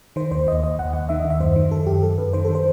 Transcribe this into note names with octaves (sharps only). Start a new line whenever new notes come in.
D#3 C5
D#2 C5
D#2 D#5
D#2 D#5
D#2 F#5
D#2 F#5
D#3 E5
D#5
D#2
E5
F#2 C5
D#3
D#3 A4
F#2 G4
F#2 A4
F#2 B4
D#3 C5
A4
D#3
C5